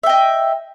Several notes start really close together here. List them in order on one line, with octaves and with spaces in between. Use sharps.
E5 G5 D#5